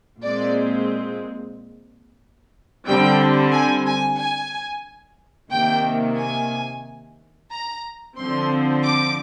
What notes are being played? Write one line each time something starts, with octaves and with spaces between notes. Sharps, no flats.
A#2 G#3 C4 D5
D3 G3 C4 G5
G#5
G#5
G#5
C3 D#3 A#3 G5
G#5
A#5
D3 F3 C4 C6
D6